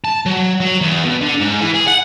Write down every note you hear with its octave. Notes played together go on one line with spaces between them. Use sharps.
A5
F#3
F#3
E2
B2
D3
G#2
E3
G#4
F#5